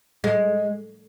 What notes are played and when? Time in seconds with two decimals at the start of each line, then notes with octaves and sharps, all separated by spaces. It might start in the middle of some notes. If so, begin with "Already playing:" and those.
0.24 G#3